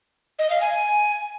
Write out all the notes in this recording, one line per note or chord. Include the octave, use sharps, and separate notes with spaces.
D#5
F5
G#5